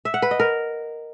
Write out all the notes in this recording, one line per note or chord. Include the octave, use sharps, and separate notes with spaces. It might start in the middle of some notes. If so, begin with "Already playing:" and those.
E5
F#5
B4
D#5
A#4